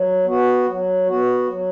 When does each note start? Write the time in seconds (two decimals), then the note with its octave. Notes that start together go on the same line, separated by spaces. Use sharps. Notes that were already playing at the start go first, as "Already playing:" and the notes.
Already playing: F#3
0.25 B3 F#4
0.67 F#3
1.07 B3 F#4
1.48 F#3